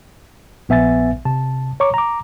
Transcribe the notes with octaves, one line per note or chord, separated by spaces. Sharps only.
A#1 B3 E5 G#5 A6
C3 A5
C#5 A#5 C#6 D6
A#5 D6